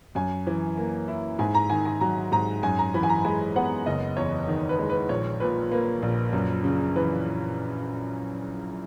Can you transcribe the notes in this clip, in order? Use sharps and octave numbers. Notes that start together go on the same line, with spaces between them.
F#2 G#5
E3
A#3
E4
G#2 G#5
A#5
D#3 G#5
G#5
F#3 A#5
G#2 A#5
F#2 G#5
A#5
E3 B5
G#5
A#5
G#3 G#5
B3 F#5
F#1 D#5
E2 C#5
D#3
B4
G#3
B4
A#1 C#5
A#2 B4
A#3 B4
A#1
F#2
C#3
E3 B4